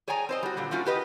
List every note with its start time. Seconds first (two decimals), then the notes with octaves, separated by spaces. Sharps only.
0.08 G#4 C#5 D5 G5 G#5 A#5
0.29 C4 C5 D#5
0.43 G3 F#4
0.57 A#2 D3 G3
0.71 A3 C4 C#4 F4 F#4
0.86 F#4 G4 B4 D#5